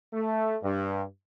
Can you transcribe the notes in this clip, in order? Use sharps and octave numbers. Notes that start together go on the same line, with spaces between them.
A3
G2